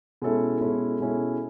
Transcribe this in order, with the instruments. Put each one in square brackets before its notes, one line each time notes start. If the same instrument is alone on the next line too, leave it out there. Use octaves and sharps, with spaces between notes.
[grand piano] B2 G#3 C#4 E4 A4
B2 G#3 C#4 E4 A4
B2 G#3 C#4 E4 A4